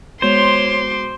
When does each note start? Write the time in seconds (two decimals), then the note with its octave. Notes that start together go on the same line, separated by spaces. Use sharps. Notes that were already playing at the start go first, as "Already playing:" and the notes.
0.22 G#3 B3 F#4 C5 C#5 C6 D6